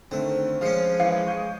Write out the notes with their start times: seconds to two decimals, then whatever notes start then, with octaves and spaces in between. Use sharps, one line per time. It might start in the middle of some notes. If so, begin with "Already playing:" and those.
0.11 D3 D#3 A3 C4
0.61 F3 G#3 C#4 F5 C7 C#7
1.00 E3 F5 C7 C#7
1.27 C#6 G6